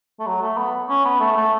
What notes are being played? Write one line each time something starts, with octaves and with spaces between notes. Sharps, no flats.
A3
F#3
A3
B3
C#4
B3
A3
A3